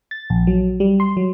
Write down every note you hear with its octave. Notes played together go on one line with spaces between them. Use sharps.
A6
A#1
F#3
G3
C6
F#3